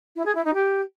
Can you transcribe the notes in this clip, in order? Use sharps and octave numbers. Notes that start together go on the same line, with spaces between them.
E4
G#4
E4
D#4
G4